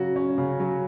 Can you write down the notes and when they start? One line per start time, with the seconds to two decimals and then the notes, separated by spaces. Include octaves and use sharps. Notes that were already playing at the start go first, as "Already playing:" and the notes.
Already playing: C#3 F#3 C#4 F#4
0.16 C#4
0.38 C#3
0.60 F#3